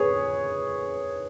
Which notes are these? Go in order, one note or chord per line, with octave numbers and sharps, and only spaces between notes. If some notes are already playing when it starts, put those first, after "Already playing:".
Already playing: G#4 B4 C#5